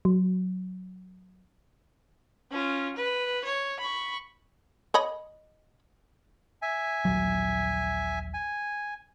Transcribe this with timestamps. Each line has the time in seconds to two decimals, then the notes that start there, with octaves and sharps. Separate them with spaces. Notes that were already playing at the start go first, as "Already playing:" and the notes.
0.05 F#3
2.51 C#4 F4
2.96 B4
3.45 C#5
3.80 B5 C#6
4.94 C#5 D#5 B5
6.62 E5 G#5
7.05 D#1 A#1 F#3
8.34 G#5